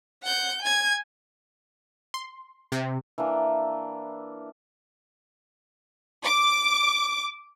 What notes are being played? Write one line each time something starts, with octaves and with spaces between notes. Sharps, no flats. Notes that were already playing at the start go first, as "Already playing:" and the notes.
F#5 G6
G#5 G#6
C6
C3
E3 A#3 D4
D6